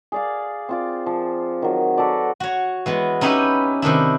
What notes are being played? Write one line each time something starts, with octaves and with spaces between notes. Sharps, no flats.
G#4 D5 F5
C4 F4 D5
F3
D#3 F#3
F#4 A4 B4 D5
F#4 C#5
E3 G#3 B3
C#4 D#4 E4 G4 B4
C3 D#3 D4 E4